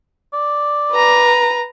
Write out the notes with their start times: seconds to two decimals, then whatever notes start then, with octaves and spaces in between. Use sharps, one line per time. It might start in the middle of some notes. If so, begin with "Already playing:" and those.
0.33 D5
0.92 B4 A#5